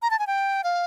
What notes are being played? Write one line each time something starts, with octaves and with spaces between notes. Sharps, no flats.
A#5
A5
G#5
G5
F5